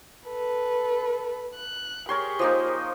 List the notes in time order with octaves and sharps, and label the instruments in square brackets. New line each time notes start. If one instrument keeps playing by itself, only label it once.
[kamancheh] A4 B4
F#6
[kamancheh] G4 G#4 [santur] A#4 C#5 C6
[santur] F3 A#3 D#4